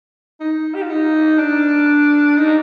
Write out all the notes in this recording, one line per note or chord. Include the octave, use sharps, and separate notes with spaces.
D#4
G4
F4
D#4
D4
D#4